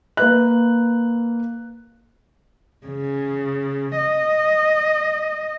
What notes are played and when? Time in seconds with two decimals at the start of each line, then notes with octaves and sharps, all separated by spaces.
0.17 A#3 B4 F#6
2.87 C#3
3.97 D#5